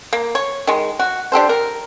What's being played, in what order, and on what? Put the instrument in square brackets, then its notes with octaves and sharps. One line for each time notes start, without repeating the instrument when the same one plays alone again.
[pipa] A#3
C#5
D#3 G#3
F#4
D4 G4 A4 C5
A#4